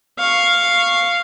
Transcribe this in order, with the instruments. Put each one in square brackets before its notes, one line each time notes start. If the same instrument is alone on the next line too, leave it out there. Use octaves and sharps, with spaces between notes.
[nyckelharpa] F5 C#6